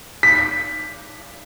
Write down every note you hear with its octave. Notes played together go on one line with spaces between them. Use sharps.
B6